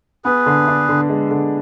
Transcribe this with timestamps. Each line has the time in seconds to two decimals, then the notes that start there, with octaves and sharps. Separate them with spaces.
0.24 B3 G#4 B4
0.46 D3
0.68 D4
0.89 D3
1.09 G#3
1.31 D3